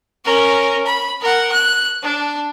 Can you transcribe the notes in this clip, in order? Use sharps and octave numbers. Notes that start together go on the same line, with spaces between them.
C#4 A#4
B5
A#4 F#5
F#6
D4